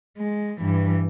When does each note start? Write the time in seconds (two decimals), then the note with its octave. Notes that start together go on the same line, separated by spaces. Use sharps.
0.17 G#3
0.60 G2 E3